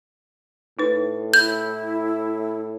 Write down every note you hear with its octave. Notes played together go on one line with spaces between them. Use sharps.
A2 D#4 B4
E4 G6